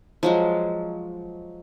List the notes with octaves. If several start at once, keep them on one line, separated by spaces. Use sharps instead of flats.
F3 F#3 G#3